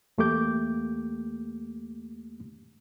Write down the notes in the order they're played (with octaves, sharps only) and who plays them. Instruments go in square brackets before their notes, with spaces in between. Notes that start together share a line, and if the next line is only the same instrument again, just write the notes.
[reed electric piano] E2 A3 A#3 G4 D6 G6